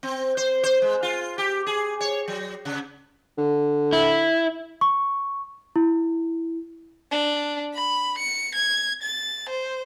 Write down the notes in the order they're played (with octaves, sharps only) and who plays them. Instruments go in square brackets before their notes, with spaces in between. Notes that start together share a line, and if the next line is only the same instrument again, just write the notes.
[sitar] C4
C5
C5
G#3
F4
G4
G#4
C#5
F#3
C#3
[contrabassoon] D3
[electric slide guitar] E4
[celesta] C#6
E4
[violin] D4
B5
C#7
G#6
A6
C5